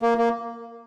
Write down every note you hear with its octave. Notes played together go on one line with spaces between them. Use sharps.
A#3
A#3